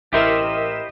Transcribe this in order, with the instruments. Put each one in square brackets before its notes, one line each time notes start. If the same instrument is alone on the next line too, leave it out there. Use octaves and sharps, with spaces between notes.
[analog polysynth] A1 A#4 E7 [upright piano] E4 [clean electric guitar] G4 C5 E5 [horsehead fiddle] D#5